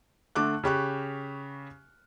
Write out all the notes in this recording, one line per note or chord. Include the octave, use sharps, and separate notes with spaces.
D3 A3 D6 F#6
C#3 G4 C#6 F#6